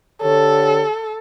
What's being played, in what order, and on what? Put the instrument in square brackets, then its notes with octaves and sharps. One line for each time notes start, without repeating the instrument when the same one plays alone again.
[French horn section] D3 G4 C#5 [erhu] A4